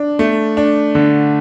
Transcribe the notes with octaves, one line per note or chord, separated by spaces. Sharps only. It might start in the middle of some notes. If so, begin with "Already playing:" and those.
Already playing: D4
A3
D4
D3